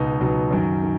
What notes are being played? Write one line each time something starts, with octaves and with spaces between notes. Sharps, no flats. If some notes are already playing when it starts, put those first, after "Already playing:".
Already playing: C#2 B2 D#4
C#2 B2 F#3 D#4
F#2 D#3 F#3
D#3